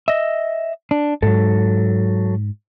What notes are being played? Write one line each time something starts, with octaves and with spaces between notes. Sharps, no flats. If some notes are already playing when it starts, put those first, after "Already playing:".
D#5 E5
D4
G#2 F#3 A4